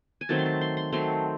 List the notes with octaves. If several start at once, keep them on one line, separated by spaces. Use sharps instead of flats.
G#5
D#3 F#3 A3 C4 A5
C6
A5
C6
C6
D#3 F#3 A3 C4 C6